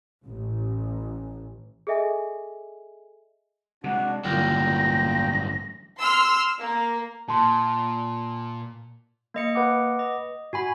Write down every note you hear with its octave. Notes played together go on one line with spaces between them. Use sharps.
A1
G#4 A4 D#5 E5 G#5
C3 G#3 D4 F#4
A1 G2 A#2 D3 F#3 G5 A#6
C6 E6 F6
A#3
A#2 A5 C6
A#3 D#5 C#7
B4 F#5 D6
D#5
G#2 F#4 G#5 B5